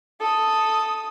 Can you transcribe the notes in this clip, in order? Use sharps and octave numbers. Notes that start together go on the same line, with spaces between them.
A4 D#6